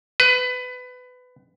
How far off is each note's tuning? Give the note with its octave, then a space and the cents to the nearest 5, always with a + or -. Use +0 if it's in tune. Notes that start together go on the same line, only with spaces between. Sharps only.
B4 +20